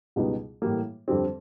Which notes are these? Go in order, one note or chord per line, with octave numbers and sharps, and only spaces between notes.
C#2 B2 G3 B3 D#4
A2 E3 G3 A#3
F2 D3 G3 C4